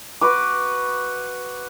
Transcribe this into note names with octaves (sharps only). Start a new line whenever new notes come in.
F#4 B4 D6